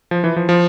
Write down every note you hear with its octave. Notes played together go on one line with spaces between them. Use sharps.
F3
E3
F3
F3